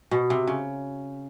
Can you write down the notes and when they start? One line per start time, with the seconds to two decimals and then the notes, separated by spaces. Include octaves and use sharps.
0.11 B2
0.30 C3
0.47 C#3